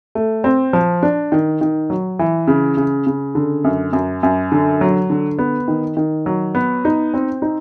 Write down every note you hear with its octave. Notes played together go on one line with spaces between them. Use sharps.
A3
C4
F3
D4
D#3
D#3
F#3
E3
C#3
C#3
C#3
D3
F#2
F#2
F#2
D3
F#3
D3
B3
D#3
D#3
F#3
B3
D#4
C4
D#4